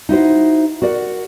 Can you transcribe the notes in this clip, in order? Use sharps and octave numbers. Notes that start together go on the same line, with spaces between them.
D#4 E4 F#4 C5
F#4 A#4 D5 E5 F#5